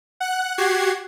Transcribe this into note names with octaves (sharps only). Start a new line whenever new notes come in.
F#5 F#6
F#4 G4 F#5 G#6 C7